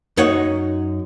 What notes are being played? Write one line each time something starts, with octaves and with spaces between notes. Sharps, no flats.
F#2 D#4 C#5 F#5